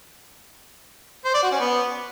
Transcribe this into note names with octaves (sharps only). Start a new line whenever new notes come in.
C5
D5
F#4
C#4
B3